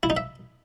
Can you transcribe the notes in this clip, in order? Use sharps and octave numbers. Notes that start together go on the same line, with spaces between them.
E4
D#4
E5